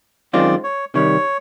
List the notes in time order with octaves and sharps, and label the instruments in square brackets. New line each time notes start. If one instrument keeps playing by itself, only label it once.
[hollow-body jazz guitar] F#2 D#3 G#3 C4 F4 [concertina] D5
[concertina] C#5
[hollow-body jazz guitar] C3 D#3 G3 [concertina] C#5